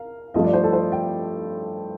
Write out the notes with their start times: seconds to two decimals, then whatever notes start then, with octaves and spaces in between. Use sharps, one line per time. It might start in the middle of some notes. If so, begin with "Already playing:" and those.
Already playing: A#4 F5
0.34 G2 F3 A3 D#5
0.44 D5
0.53 C5
0.63 A4
0.73 C5
0.92 G5